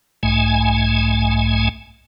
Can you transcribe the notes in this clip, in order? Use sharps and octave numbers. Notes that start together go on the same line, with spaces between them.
B1 G#2 A3 G#5